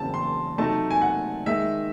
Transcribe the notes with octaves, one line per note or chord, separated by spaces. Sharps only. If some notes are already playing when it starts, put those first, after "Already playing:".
Already playing: E2 C#3 F#3 C4 E4 A5
C6
C3 F#3 A3 D#4 A5
G#5
F#5
D#3 G#3 D#4 E5